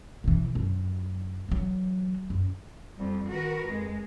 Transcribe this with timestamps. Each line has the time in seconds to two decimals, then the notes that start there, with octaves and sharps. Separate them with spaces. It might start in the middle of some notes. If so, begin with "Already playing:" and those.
0.24 B2 E3
0.55 F#2
1.49 E3 F#3
2.30 F#2
2.98 F2 G3
3.29 D#3 F#4 A#4 B4
3.67 F2 G#3